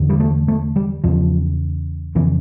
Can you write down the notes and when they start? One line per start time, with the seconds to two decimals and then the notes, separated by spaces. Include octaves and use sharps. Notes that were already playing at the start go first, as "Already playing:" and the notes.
Already playing: E2 D3
0.09 G3
0.20 A3
0.48 A3
0.76 G3
1.04 E2 C#3 F3
2.15 F2 C#3 E3